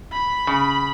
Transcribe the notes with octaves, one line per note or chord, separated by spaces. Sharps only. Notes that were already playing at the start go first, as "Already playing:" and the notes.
B5
C#3